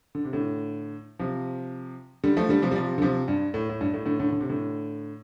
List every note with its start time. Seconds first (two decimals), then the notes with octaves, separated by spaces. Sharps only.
0.15 D3
0.25 C3
0.33 A2 D3
1.19 C3 F3
2.24 D3 G3
2.37 F3 A3
2.49 D3 G3
2.62 C3 F3
2.71 G3
2.76 C3 F3
2.98 D3
3.02 C3 F3
3.28 G2
3.54 A2
3.70 A2
3.81 G2
3.94 A2
4.06 A2 D3
4.20 A2 D3
4.32 D3
4.41 C3
4.49 A2 D3